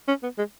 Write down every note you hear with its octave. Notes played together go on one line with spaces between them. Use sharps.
C#4
B3
G#3